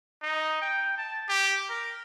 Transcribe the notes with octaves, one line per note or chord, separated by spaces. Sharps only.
D#4
G5
A5
G4
A#4